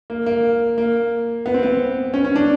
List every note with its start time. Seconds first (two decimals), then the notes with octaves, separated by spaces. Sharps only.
0.10 A#3
0.26 A#3
0.78 A#3
1.46 B3
1.54 C4
1.63 B3
2.14 C#4
2.25 C#4
2.36 D4